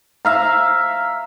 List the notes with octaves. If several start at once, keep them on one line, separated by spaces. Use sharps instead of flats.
E5 F5 A#5